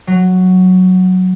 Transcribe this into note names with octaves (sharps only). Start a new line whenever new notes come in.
F#3